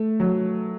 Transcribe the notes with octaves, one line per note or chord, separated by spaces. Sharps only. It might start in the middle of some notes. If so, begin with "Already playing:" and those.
Already playing: A3
F#3